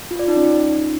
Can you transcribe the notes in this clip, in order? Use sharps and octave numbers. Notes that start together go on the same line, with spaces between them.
F4
D5
D#4
C#4
D#4